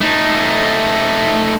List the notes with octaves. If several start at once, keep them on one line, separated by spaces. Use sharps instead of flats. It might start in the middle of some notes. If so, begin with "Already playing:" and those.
A3 D#4